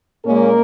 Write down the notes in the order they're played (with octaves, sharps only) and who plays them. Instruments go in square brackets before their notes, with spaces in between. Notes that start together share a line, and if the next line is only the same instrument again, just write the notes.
[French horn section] A#2 G#3 A#3 C#4 A#4